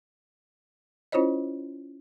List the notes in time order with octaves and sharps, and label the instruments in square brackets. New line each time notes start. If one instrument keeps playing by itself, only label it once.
[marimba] C#4 E4 F4 C5 C#5 D#5